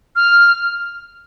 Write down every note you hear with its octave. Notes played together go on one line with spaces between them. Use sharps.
F6